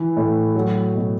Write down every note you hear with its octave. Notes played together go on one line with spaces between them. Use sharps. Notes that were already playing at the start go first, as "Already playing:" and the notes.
Already playing: E3
A2
F#3
B2